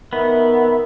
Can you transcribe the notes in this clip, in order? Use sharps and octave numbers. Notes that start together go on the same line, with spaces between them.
D#3 B3 E5